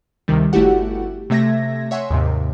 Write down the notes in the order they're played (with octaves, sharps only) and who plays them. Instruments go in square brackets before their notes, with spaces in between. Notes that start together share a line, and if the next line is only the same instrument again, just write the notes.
[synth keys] D2 C3 D#3 G3
G1 A3 E4 F#4 G4 F#5
C3 A3 E5 G#6 A#6
C#5 E5 F#5 G#5 C6
D#2 G#2 C3